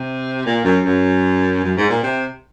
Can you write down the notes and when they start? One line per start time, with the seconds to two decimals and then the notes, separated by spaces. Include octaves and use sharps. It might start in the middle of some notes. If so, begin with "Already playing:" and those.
Already playing: C3
0.46 A#2
0.65 F#2
0.85 F#2
1.65 F#2
1.78 G#2
1.91 A#2
2.04 C3